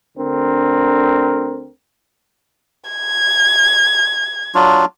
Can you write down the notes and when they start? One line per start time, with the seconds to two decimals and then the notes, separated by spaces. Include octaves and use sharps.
0.18 D2 D3 C4 A#4
2.90 G#6
4.55 F#3 D4 F4